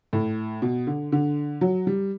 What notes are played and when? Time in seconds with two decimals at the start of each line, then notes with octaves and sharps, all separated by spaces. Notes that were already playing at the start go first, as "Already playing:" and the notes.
0.13 A2
0.62 B2
0.87 D3
1.12 D3
1.61 F#3
1.87 G3